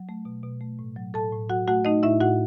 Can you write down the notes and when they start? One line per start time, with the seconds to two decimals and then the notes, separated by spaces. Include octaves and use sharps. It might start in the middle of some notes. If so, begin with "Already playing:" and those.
Already playing: F#3
0.09 A3
0.25 B2
0.43 B2
0.61 A3
0.79 A2
0.96 F#3
1.14 A2 A4 A5
1.32 A2
1.50 F#3 F#4 F#5
1.68 A3 F#4 F#5
1.85 A3 D#4 D#5
2.03 A2 E4 E5
2.21 A2 F#4 F#5